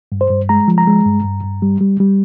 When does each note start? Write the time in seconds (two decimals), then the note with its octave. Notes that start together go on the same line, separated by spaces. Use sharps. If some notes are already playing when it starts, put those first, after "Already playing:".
0.12 G2
0.21 C5
0.30 G2
0.49 G#3 A#5
0.68 F3
0.78 A#5
0.87 G#3
1.06 G2
1.25 G2
1.43 G2
1.62 G3
1.81 G3
2.00 G3